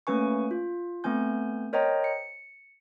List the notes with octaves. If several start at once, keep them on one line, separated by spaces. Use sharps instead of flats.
A3 A#3 C#4 B4 G#5 C#6
F4
A3 B3 C4 G#5 G6
A#4 C5 C#5 D#5 G5 A#5
C#7